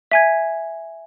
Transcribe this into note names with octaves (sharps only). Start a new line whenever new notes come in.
E5 G#5 G#6